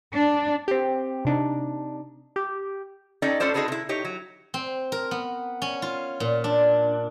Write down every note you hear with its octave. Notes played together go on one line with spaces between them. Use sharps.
D4
C4 G4
C3 D4 D#4
G4
C#4 D#4 A4 D5 D#5 G5
A2 C#4 F4 A4 C5 D5
C4 D#4 F#4 G#4 A4 B4
C3 E4
D#4 G4 C#5
F#3
C4
A#4
B3
C#4
F4
A#2
D4